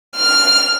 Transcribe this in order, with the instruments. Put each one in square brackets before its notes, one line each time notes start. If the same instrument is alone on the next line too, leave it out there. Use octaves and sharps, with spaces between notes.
[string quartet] F6